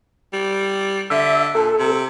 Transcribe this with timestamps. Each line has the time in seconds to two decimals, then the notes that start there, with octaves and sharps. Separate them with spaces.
0.33 G3
1.10 D3 E5
1.55 A#2 A4
1.79 C3